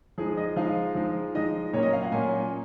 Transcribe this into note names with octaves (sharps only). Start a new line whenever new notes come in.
F3 G#3 D#4 G#4
D#5
F3 G#3 D#4 F5
F3 G#3 D#4
F3 G#3 D#4 D#5
A#2 F#3 A#3 C#4 C#5
D#5
F5
F#5
A#2 F#3 A#3 C#4 G#5